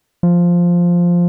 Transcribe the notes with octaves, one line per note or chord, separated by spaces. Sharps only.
F3